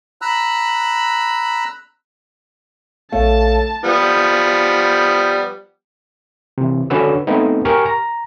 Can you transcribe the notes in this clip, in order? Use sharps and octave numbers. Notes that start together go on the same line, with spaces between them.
A#5 B5 E6 F#6
A#1 A3 C#5 F5 A5
F3 G3 B3
C3 E3
D3 C#4 F#4 B4 E6
A3 B3 C4 D#4
G4 A#4 G#5 C#6 F6
A#5